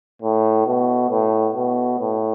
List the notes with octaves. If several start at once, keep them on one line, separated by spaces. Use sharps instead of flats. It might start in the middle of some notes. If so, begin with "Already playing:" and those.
A2
B2
A2
B2
A2